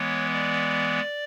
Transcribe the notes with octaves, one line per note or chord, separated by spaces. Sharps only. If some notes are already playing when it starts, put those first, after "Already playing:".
Already playing: E3 G#3 B3 C#5
D5